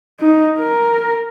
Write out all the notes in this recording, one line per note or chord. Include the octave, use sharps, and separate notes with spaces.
D#4
A#4